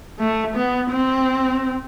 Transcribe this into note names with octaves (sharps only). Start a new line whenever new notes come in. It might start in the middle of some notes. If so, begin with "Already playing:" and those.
A3
B3
C4